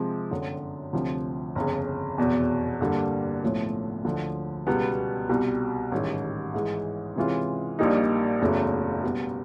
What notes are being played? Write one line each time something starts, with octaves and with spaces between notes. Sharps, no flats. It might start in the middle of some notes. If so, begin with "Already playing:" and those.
Already playing: C3 F3 G#3
G1 F#2 D3
D2 C3 F3
G1 F2 C#3
F1 E2 B2
G2 D3 G3 A#3
B1 A2 F3 A3 C#4
D2 D3 F3
C#2 B2 G3 B3
C2 B2 G3
A1 G#2 D#3 G3
G#2 E3 G#3
C3 E3 G#3 C#4 F4
A#1 A#2 G3 A#3 D#4
F#1 E2 C#3 F#3 A3
B2 G3 B3